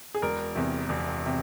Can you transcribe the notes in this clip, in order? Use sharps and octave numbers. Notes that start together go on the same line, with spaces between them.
G#4
E1 A#4
E2 C3
E1
C3